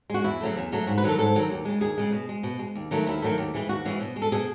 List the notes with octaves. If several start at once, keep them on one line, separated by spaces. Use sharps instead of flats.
G#3 F#4
E2 E4
C#3 F#3 A3
E2
C#3 F#3 A3
G#2 F#4
B4
D#3 F#3 A4
G#2 A4
D#3 F#3
D#2
C#3 G#3
D#2 G#4
C#3 G#3
B2
G#3
B2
G#3
D#2
D#3 F#3 A3
D#2 E4
D#3 F#3 A3
D#2
C#3 E3 G#3
D#2 F#4
C#3 E3 G#3
B2
G#3
A4
B2 G#4